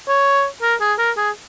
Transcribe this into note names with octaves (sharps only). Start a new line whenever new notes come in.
C#5
A#4
G#4
A#4
G#4